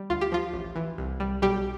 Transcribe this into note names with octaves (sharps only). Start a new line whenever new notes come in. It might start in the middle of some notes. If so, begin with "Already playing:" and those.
Already playing: G3
D2 F4
G4
F3 F4
A1
E3
C2
G3
B1 G3 G4